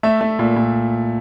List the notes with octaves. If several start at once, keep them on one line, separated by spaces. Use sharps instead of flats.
A3 E5
A3
A#2
A#2